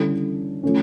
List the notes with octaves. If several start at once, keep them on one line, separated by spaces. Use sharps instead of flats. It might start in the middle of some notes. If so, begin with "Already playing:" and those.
Already playing: D3 G3 C#4 E4 A4
F3 A3 C#4